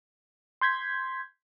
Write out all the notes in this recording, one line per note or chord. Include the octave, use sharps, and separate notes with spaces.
C6 G6 G#6 B6